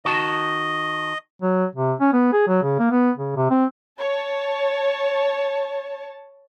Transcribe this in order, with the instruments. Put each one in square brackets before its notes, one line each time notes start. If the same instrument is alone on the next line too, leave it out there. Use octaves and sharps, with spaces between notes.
[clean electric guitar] D#3 F#4 A5 [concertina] D#5
[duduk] F#3
C3
C#4
B3
G#4
F#3
C#3
A#3
B3
C#3
C3
C4
[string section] C#5 A5